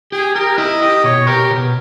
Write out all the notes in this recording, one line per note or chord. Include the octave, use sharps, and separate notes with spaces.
G4 G#4
G4 A#4
E4 D#5
G4 D#5
B2 C#5
G4 A#4
B2